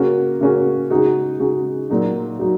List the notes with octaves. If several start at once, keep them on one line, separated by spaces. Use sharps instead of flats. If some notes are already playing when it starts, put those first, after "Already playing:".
Already playing: C#3 A#3 C#4 F#4
C#3 A#3 C#4 F#4
C#3 G#3 D#4 F#4
C#3 G#3 D#4 F#4
A#2 F#3 D#4 F#4
F#3 D#4 F#4